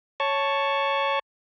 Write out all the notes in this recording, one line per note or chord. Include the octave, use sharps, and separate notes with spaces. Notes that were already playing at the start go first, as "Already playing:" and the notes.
C#5 A5 C#6